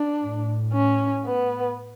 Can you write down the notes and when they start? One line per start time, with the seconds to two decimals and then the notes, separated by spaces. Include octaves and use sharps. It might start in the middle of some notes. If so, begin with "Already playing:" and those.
Already playing: D4
0.21 A2
0.73 C#4
1.26 B3